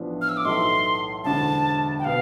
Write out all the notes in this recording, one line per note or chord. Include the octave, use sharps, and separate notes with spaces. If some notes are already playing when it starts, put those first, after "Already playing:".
Already playing: A1 A2 F3 B3 D4
F6
E6
D6
B1 A2 E3 A3 C6
E1 D2 D3 A5
G5
B2 B3 F5